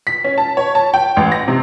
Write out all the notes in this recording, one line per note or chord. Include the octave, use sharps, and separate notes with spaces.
B6
C#4
A5
C#5
A5
G5
A1
A#6
C3